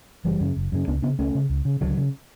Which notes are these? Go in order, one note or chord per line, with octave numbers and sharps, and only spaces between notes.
F#1 E3 G3
F#2 C#3
F#1
F#2 C#3
C#2 B3 D4
C#3 B3 D4
C#2 A3 C#4
C#3
C#2
C#3
C#2 D3 F#3
C#3